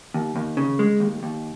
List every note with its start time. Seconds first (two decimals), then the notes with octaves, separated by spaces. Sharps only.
0.14 D#2
0.36 D#2
0.57 C#3
0.79 G#3
1.00 D#2
1.23 D#2